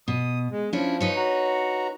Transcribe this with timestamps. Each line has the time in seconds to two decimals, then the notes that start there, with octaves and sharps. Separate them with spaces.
0.08 B2 D#6
0.51 G#3
0.73 F3 C#4 D4 E4
1.01 D#4 B4 C#5
1.16 F#4 A#5